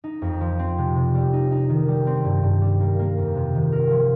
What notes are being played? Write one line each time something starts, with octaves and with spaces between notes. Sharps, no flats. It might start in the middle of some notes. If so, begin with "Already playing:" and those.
D#4
F2
F3
C4
C3
C3
G3
D#4
D#4
D#3
G3
C4
G2
G2
G3
A#3
A#3
F2
C3
D#3
A#4
F3